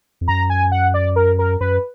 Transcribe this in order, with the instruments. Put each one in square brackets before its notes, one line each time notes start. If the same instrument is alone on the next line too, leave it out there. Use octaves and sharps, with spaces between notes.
[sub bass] F2
[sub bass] F#2 [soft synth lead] A#5
[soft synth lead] G#5
F#5
D5
A#4
A#4
[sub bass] F#2 [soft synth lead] B4